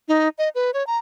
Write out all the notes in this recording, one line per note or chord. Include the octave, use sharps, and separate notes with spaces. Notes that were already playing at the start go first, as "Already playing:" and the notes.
D#4
D#5
B4
C#5
A#5